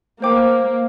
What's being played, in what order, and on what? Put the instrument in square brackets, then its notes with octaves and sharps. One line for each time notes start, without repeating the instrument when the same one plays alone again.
[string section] A#3 [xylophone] C5 G5 D6